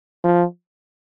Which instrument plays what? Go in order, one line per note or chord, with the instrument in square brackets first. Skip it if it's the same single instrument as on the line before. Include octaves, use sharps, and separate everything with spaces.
[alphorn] F3